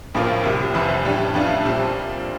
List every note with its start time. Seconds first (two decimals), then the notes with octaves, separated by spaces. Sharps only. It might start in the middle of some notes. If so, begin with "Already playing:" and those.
0.15 A#1 A2 F3 A#3 F4
0.44 C2 C3 G3
0.74 F1 F2 E3 A3 C4
1.05 A2 G3 D4 G4
1.34 F2 E3 A3 D4 F4
1.65 A#2 G3 C4